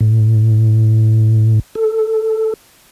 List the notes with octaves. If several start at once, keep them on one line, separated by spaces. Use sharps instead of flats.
A2
A4